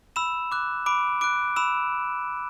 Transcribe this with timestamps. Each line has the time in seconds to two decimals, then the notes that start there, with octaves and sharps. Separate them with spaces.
0.16 B5 E6 E7
0.52 D6 F#6
0.86 B5 D6 D7
1.21 D6 F#6 D7
1.56 B5 E6 E7